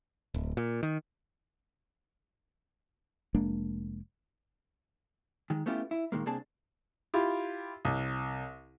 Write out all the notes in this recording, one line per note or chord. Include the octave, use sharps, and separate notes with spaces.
D1
A#2
D#3
F1 G#3 A#3 D4
D#3 G#3
A3 B3 C#4 E4 F4 G4
E4
A#2 D#3 G#3 A#3
C2 A#3 C4 D4 G#4 A5
E4 F4 G4
C2